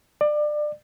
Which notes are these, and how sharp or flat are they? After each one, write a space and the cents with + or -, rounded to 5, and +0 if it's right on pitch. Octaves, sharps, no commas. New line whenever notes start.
D5 +25